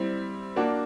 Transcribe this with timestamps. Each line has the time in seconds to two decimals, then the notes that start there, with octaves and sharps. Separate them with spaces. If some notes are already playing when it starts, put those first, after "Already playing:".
Already playing: G3 C4 E4
0.56 A#3 D4 F#4